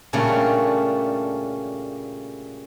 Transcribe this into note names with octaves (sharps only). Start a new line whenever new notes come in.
A#2 C#3 G3 A3 C#4 D4